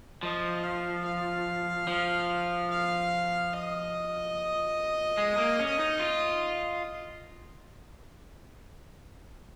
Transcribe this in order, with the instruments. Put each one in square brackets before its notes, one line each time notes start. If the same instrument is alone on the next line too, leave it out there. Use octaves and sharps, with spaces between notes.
[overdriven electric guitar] F3 [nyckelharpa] D#5
[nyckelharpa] F5
F5
[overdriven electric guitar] F3
[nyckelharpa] F5
D#5
[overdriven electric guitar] G#3
A#3
C#4
D#4
F4